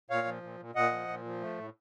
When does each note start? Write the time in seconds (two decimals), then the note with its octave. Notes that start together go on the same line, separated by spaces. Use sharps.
0.10 A#2 C#5 F5
0.27 F3
0.43 A#2
0.60 A#2
0.75 A#2 D#5 F#5
0.92 F3
1.08 A#2
1.25 F3
1.42 A3
1.58 A2